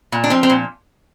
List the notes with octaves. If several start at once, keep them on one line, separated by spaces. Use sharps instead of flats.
A#2
D4
F3 C4
C4
A#2